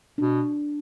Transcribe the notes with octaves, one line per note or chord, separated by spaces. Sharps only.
B2 D4